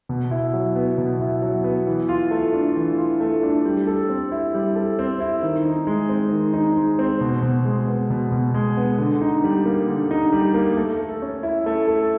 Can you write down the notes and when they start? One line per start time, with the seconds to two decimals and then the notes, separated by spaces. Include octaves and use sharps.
0.09 B2
0.31 E4
0.53 F#3
0.76 B3
0.98 B2
1.21 E4
1.42 F#3
1.64 B3
1.87 E3
2.09 F4
2.31 A3
2.53 D4
2.76 E3
2.98 F4
3.20 A3
3.43 D4
3.65 G3
3.87 A4
4.09 C4
4.32 E4
4.54 G3
4.76 A4
4.99 C4
5.20 E4
5.42 D#3
5.65 D#4
5.87 G#3
6.09 C4
6.32 D#3
6.54 D#4
6.77 G#3
6.99 C4
7.21 B2
7.43 B2
7.65 G#3
7.87 B3
8.10 B2
8.32 B2
8.54 G#3
8.77 B3
8.98 D3
9.21 D#4
9.44 G3
9.66 A#3
9.88 D3
10.11 D#4
10.33 G3
10.54 A#3
10.77 A3
10.99 A4
11.22 C#4
11.43 E4
11.66 A3
11.88 A4